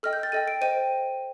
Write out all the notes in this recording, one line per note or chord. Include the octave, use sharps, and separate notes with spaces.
A4 D#5 G5 F6
G6
A6
A4 D#5 G5 D#7
D7
C5 D#5 G5 D#7